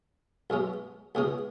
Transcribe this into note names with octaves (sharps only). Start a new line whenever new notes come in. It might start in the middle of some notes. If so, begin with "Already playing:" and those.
B1 B2 G#3 C#4
C#2 B2 G#3 C#4 G#4